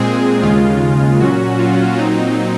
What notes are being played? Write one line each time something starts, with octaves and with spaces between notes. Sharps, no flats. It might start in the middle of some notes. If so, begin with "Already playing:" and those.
Already playing: A#2 G#3 C4 G#4
D#2 C#3 G#3 F4
A#2 F#3 C#4 F#4
F4
A#2 F#3 C4 D#4